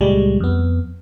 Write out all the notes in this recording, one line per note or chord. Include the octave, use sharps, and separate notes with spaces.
C#2 A#2 G3 G#3
F2 B3